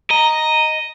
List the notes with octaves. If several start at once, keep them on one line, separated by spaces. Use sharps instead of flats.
D#5 A#5